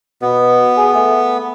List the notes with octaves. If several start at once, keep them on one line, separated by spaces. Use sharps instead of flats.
B2 B3
G#4
A3